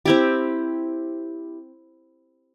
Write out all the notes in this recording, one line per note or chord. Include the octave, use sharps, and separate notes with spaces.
C4 E4 G4